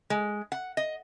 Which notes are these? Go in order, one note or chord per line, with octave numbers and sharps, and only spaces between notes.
G#3
F#5
D#5